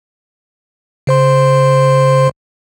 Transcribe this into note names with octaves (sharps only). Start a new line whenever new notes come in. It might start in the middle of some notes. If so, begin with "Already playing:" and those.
C#3 C5 C6